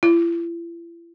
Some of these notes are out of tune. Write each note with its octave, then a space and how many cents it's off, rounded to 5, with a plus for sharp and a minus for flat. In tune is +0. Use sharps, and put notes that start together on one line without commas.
E4 +45